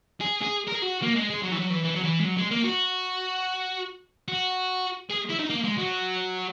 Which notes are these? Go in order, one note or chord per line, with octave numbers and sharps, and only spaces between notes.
G#4
G#4
A#4
G#4
F#4
A#3
G#3
G#3
F#3
E3
F#3
E3
E3
F#3
E3
G#3
F#3
G#3
A#3
F#4
F#4
G#4
E4
D#4
A#3
G#3
F#3